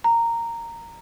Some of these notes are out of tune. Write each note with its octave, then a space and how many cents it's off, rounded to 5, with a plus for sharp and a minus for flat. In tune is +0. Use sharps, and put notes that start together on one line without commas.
A#5 -10